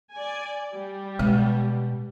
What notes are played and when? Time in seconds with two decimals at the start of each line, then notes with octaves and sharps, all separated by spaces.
0.12 D5 G#5
0.73 G3
1.19 B2 G#3